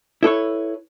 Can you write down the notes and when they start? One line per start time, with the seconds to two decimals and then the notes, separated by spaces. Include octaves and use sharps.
0.23 E4 A4 B4 C#5